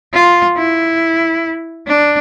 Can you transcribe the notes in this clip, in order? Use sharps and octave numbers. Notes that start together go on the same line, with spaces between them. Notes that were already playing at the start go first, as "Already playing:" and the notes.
F4
E4
D4